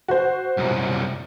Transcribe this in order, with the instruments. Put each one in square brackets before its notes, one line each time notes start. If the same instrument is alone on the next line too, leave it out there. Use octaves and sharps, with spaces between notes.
[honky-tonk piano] F#4 C5
[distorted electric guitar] C2 F#2